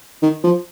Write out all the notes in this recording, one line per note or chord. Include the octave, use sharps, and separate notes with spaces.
D#3
F3